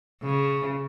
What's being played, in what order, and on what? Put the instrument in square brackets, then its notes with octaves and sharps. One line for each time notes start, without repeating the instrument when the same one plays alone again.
[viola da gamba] C#3